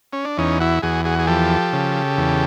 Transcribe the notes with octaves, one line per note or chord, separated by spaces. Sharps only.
C#4
D4
E2 C#4 D#4
E4 F#4
E2 F#4 G#4
F#4 G#4
G#4
F3 G4 A4
C#3
E2